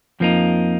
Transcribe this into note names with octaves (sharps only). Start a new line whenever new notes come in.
F2 F3 A#3 D#4